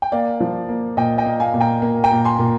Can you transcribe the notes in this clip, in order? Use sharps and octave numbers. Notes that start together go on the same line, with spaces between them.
G5
A#3 D5 F5
F3
A#3
A#2 D#5 G5
D#5 G5
A#3
F5 G#5
A#2
G5 A#5
A#3
G5 A#5
A#2
G#5 C6
A#2